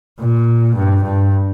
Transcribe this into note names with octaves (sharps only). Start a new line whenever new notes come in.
A#2
G2
G2